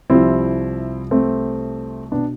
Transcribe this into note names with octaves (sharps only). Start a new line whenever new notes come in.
C2 C3 F3 C4 E4
A3 C4
B2 B3 D4